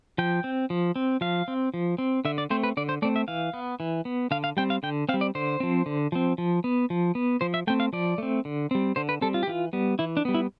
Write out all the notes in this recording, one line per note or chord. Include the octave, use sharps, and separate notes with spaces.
F3 G5
C4
F3
C4
F3 F5
C4
F3
C4
D3 E5
D5
A3 C4 C5
B4
D3 D5
C5
A3 C4 D5
E5
E3 F5
B3
E3
B3
D3 F5
F5
G3 C4 G5
F5
D3 G5
C4 F5
G3
D5
D3 C5
F3 C4
D3
F3 C4
F3
B3
F3
B3
F3 C5
E5
A3 C4 G5
F5
F3 D5
A3 C4
D3
G3 C4
D3 C5
B4
G3 C4 A4
F4
G4
E3 F4
G3 B3
E3 E4
D4
G3 B3
E4